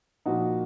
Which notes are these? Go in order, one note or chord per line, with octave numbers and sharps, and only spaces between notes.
A#2 F3 D#4 F#4